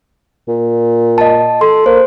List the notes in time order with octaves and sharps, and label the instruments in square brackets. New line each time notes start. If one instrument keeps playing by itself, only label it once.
[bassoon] A#2
[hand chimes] D#5 A5
[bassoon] A4 [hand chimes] C6
[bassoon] A#3 [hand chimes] C5